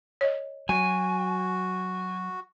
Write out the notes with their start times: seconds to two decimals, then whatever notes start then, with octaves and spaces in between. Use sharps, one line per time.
0.21 C#5 D#5
0.69 F#3 F#4 G#5